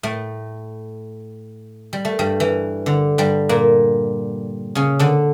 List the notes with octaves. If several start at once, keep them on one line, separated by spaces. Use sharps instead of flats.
A2 A3
G3
A3
G2 G3
E3
D3
G2 G3
A#2 A#3
C#3 C#4
D3 D4